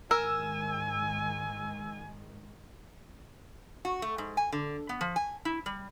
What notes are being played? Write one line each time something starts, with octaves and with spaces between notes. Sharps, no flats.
G#2 D#3 G#3 A#4 G#5 E6
F#4
A3
G#2
G#5
D3
B3
F3
G#5
E4
G3